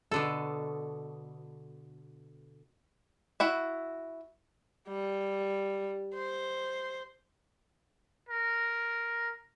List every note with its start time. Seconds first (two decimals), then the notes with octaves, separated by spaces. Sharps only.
0.11 B2 D3 A4
3.40 E4 F#4 E5
4.88 G3
6.15 C5
8.29 A#4